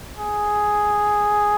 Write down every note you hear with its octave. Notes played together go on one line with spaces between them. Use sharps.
G#4